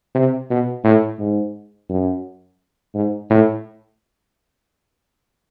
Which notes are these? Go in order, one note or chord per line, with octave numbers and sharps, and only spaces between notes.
C3
B2
A2
G#2
F#2
G#2
A2